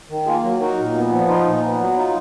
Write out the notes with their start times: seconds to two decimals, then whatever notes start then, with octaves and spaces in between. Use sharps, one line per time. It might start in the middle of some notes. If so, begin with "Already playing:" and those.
0.09 D#3
0.26 A#3 F4 G#4
0.43 F#3
0.60 D#4 F#4 A#4
0.78 A#2
0.95 B3
1.12 F3
1.28 D#4 F4
1.46 A#2
1.63 B3
1.80 F#3
1.97 D#4 F4